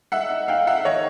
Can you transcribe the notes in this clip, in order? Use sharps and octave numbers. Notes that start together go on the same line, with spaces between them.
D#4 E5 F#5
D#4
D#4 F5 G5
D#4 E5 F#5
D#3 C#5 D#5